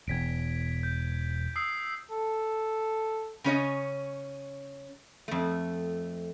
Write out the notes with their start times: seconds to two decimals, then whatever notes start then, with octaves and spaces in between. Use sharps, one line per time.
0.08 E1 E2 G#6 B6 D7
0.83 G6
1.56 D#6 E6 C7
2.11 A4
3.44 C#3 C#4 C#5 D#5
5.28 F2 A3